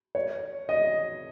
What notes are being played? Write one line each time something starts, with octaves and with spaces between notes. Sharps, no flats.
C#5
D#5